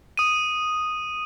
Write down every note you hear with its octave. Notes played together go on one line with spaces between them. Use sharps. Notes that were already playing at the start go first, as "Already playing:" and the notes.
D#6 D#7